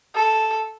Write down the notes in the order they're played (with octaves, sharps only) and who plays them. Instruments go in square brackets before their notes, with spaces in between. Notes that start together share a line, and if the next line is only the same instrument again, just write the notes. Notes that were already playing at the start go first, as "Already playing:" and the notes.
[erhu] A4